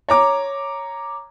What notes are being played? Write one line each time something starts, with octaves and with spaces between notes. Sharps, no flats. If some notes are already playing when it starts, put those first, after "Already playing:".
C#5 A#5 D6